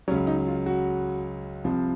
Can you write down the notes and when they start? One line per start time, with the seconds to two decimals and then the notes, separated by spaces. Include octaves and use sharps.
0.08 C#2 C#3 F#3 C#4
0.27 D#4
0.47 F4
0.66 F#4
1.64 C2 C3 F3